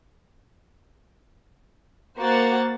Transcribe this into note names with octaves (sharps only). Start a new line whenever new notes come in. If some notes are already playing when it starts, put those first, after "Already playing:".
A#3 F#4 C5 F#5 A6